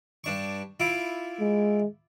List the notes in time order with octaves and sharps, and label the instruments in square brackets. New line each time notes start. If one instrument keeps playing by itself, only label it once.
[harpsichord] G2 D4 C#6
E4 F4 D6
[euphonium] G#3